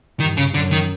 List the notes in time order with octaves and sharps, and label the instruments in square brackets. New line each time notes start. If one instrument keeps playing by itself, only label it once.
[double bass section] G2 [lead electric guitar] D#3
[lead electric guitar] C#3
[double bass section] F#2 [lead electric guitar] D3
[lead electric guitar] D#3